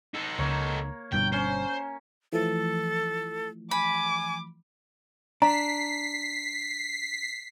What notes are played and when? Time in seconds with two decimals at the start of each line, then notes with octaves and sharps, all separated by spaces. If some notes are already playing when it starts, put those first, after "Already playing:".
0.14 D#4 A4
0.39 C#2 A#3 C#5
1.13 G1 G2 B2 G5
1.33 C#4 C5
2.32 E3 F3 A3 A4
3.71 G#5 B5 D6
5.42 D4 A#5 B6 C7